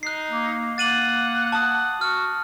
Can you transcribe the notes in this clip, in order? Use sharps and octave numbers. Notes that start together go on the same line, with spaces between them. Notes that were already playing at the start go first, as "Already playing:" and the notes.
D#4 F#6 C7
A#3
A#3 F#5 A6 D#7 F#7
F#5 A5 D#6
F#4 F6